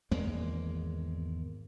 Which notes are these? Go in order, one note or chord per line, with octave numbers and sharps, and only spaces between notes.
G#1 E2 G#3 A#3